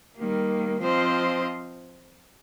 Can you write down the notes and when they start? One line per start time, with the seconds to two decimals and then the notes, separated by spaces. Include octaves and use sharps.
0.17 D#3 G3 A#3
0.80 F3 C4 F4 C5 D#5